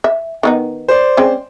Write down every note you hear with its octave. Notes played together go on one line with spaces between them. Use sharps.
E5
D#3 B3 D#4
C5 D5
G#3 C4 C#4